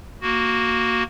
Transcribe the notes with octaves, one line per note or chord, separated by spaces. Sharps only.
A#3 F#4